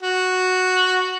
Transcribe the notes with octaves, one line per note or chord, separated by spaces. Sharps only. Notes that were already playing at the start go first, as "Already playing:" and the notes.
F#4